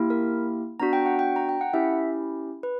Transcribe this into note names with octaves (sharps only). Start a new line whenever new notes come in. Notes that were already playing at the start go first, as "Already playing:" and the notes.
Already playing: A#3 E4 G4
A#4
B3 D4 F#4 A#5
G5
F#5
G5
A#5
G5
F#5
C#4 E4 G4 E5
B4